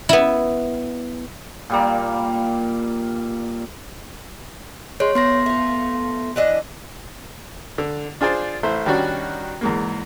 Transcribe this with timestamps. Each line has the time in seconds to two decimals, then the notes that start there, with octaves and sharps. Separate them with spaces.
0.09 B3 E4
1.70 A#2 G3 A#3
5.00 G#3 C#5 C6
5.15 A3 B3 C6 A#6
5.46 A3 F4
6.36 E3 D4 D#5
7.78 D3
8.21 D4 F4 G#4 C5 D5
8.63 A1 A3 E4 C5
8.86 D#3 G3 C#4 D4 F#4
9.61 E2 G#2 A#3